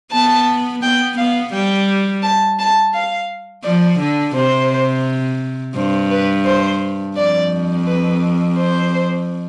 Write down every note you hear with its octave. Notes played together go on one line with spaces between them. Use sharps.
B3 A5
B3 G5
B3 F5
G3 G5
A5
A5
F5
F3 D5
D3
C3 C5
G2 C5
B4
C5
F2 D5
B4
C5